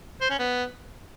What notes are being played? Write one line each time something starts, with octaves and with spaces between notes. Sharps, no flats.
C5
C#4
B3